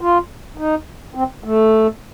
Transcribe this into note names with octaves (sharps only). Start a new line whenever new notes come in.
F4
D#4
C4
A3